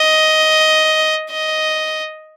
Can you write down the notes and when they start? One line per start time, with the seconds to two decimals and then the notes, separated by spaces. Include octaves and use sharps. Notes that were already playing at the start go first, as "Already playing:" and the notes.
Already playing: D#5
1.30 D#5